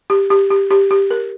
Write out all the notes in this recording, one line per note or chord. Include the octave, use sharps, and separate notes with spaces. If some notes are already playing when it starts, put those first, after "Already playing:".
G4
G4
G4
G4
G4
A#4